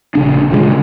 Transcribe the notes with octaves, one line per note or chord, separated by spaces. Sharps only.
A#1 C#3 D4
A#2 C#3 F#3 G#3